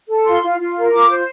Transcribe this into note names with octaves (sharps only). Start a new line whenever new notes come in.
A4
F4 C6
F4
F4
A#4
F4 D6
C5